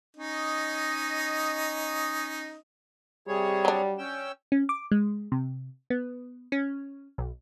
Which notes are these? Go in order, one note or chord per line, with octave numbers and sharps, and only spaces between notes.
C#4 D#4 D#5
C3 G3 G#4 C#5
F#3 D4
C#4 G5 E6
C#4
D6
G#3
C3
B3
C#4
B1